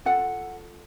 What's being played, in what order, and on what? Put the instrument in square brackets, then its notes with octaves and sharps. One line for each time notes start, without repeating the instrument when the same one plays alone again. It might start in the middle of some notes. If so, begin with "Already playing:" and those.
[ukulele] F4 A4 F#5